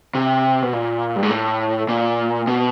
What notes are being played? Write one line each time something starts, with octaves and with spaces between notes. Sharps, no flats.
C3
B2
A#2
G2
G#2
A2
A#2
B2